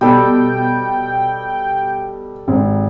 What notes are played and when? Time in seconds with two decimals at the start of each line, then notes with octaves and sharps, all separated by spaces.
0.01 B2 G3 A4 G5
2.48 G#1